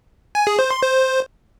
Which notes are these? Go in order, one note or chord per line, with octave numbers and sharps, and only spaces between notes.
G#5
G#4
C5
C6
C5